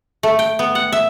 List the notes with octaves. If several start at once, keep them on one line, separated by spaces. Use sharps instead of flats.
A3
G5
B3
F#5
E5